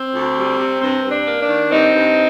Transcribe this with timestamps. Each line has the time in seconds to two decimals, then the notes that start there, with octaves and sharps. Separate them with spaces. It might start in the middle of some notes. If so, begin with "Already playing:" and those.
Already playing: C4
0.13 D2
0.36 G3
0.58 C3
0.81 G2 C4
1.03 G2
1.11 D4
1.26 A#3
1.41 D4
1.48 D#3
1.70 G2 C4 D#4
1.93 G2